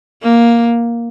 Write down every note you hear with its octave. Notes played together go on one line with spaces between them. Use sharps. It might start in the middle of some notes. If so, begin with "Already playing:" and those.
A#3